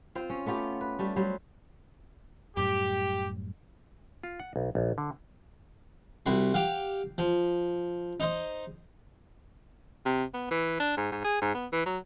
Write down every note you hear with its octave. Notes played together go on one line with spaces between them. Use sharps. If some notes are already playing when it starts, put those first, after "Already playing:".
C4 F4 C5
C#4
A3 B3 F4 G4
B4
G3 A3
F#3 G3 C5
F#2 A2 G3 G4
F4
F#5
B1
A#1
D3
C2 F#4 B5 C6
G4 F5 F#5
F3
D#4 C5 D#5
C3
B3
E3
D4
G#2
G#2
G#4
G#2
B3
E3
F#3